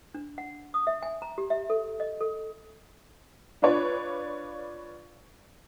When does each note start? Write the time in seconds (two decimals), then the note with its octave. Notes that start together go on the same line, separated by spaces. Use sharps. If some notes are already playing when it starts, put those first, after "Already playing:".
0.15 D4
0.38 F#5
0.74 D#6
0.87 E5
1.03 G#5
1.22 A#5
1.38 G4
1.50 E5
1.70 A4
2.00 D#5
2.21 A4
3.62 D4 F4 B4 C#5 D5